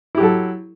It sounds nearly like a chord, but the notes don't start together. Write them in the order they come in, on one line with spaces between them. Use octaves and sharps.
E4 G4 F#3 A4